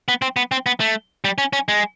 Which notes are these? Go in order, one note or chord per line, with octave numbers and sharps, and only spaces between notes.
B3
C4
B3
C4
B3
A3
G3
C#4
C#4
G#3